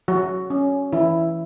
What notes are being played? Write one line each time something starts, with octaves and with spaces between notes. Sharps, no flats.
F#3 F#4
C#4
E3 E4